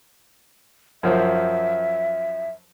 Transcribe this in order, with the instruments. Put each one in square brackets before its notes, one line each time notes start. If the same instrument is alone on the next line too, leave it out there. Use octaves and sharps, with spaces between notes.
[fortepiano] F#2 F3 C5 [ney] E5